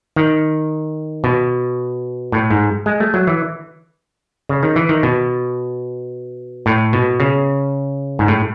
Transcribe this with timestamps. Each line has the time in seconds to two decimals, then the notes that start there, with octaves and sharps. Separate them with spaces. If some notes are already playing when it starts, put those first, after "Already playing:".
0.16 D#3
1.24 B2
2.32 A2
2.51 G#2
2.86 G#3
3.00 A3
3.14 F#3
3.27 E3
4.49 C#3
4.63 D#3
4.76 E3
4.89 D#3
5.03 B2
6.66 A2
6.93 B2
7.20 C#3
8.19 G#2
8.28 A2